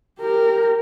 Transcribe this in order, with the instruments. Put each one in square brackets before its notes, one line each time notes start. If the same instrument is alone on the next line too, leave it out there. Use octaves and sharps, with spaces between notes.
[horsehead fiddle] G4 A#4